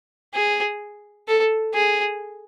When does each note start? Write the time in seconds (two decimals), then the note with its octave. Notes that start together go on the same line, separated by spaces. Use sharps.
0.34 G#4
1.28 A4
1.74 G#4